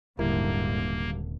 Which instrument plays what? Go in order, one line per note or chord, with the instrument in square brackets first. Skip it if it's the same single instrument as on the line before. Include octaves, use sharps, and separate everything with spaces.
[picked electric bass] D#1 [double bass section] G#1 D3 [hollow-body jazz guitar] G3 E4 A#4 [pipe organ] A#3